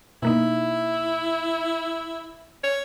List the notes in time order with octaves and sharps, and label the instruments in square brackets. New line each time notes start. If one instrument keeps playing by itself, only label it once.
[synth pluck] B2 A#3 D#4 [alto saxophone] E4
[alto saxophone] C#5